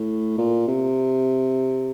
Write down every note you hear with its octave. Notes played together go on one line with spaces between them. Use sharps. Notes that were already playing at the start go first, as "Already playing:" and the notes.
Already playing: A2
A#2
C3